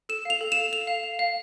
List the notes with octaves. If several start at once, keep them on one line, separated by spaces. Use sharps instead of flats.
A4 E7
F5 F7
A4
F5 E7
A4 F7
F5
F5
F5